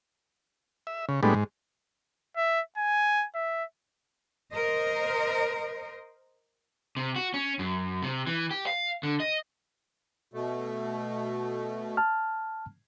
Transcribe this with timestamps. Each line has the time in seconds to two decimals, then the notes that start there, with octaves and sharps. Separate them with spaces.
0.87 E5
1.09 C#3
1.23 A2 G3 G#3 B3 D4
1.35 G#2
2.36 E5
2.77 G#5
3.35 E5
4.53 A#4 C5 D#5
6.97 C3
7.16 F#4
7.34 C#4
7.59 F#2
8.03 C3
8.27 E3
8.51 G4
8.67 F5
9.03 D3
9.20 D#5
10.34 B2 A3
11.97 A5 F6